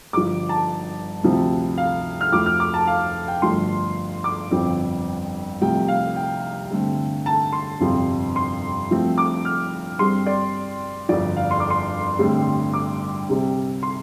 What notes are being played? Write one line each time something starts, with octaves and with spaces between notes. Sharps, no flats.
G1 G2 F3 D6
A5
D2 C3 F3 C4
F5
F6
F2 F3 A3 D6
F6
D6
A5
F5
G5
G1 G2 F3 A3 C6
D6
G1 F2 F3 C4
C2 C3 F3 A3 G5
F5
G5
G2 D3 A3 C4
A5
C6
G1 F2 C3 F3 C4
C6
G2 F3 A3 C4
D6
F6
G2 G3 C4 C6
D5
G1 F2 F3 D5
F5
C6
D6
C6
A1 G2 D3 G3 C4
D6
C2 C3 G3 C4
C6